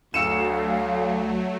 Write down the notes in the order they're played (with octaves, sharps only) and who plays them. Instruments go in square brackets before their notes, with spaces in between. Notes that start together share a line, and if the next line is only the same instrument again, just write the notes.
[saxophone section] D2 [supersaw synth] F#3 A3 [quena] F5 [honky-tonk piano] E6 C#7 E7